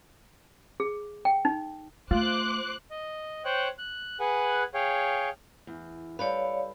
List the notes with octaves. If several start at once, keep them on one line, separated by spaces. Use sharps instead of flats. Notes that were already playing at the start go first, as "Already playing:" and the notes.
G#4
G5
D#4
A3 F4 C5 D6 F#6
D#5
C5 C#5 G5 F#6
F#6
G#4 B4 F#5 G#5
G#4 C#5 F5 G5
E2
G3 A4 B4 C#5 D5 F5